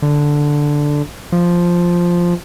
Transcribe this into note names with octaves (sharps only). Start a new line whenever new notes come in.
D3
F3